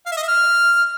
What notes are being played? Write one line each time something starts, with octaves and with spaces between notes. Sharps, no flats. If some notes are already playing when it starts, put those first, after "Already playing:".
F5
E5
D#5
E5
F6